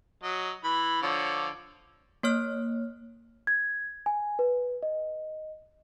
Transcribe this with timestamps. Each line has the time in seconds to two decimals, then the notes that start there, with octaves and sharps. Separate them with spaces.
0.23 F#3 D#5
0.64 E3 B5
1.03 D3 F3 C#5
2.23 A#3 C#5 F6
3.47 G#6
4.06 G#5
4.39 B4
4.83 D#5